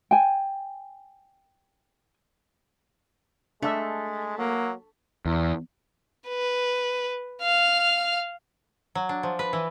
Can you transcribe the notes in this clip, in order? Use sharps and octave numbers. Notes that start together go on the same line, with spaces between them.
G5 G#5
G#3 A3 D4 E5
F#3 A#3
E2
B4
F5 F6
F#3
D4
F3
B4
E3